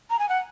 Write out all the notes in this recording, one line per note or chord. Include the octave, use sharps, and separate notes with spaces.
A#5
G#5
F#5